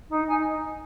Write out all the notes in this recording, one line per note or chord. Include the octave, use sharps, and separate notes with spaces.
D#4
D#4 G#5